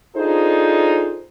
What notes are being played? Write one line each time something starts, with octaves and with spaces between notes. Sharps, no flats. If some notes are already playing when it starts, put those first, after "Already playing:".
D4 D#4 F4 G#4 A4 C5